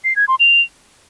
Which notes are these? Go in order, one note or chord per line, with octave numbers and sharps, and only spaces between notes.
C7
G#6
C6
F7